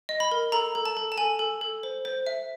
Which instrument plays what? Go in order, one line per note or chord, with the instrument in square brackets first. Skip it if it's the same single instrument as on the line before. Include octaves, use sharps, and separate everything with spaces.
[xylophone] D#5
B5
A#4
A4 A#5
A4
A5
A4
A5
A4 G#5
A4
A4
C5
C5
E5